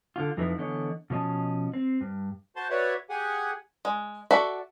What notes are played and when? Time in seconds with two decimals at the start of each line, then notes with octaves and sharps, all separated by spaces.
0.16 D3 E3 F4
0.37 F2 F3 D#4 E4 B4
0.58 D3 E3 B3 C#5 D#5
1.10 B2 F3 C#4 D#5 A5
1.74 C4
2.01 G2
2.56 F#4 C5 A5 C6
2.70 F#4 B4 C#5 D5 E5 F#5
3.09 G4 G#4 F#5 G#5
3.85 G#3
4.31 F#4 A4 D5 E5 B5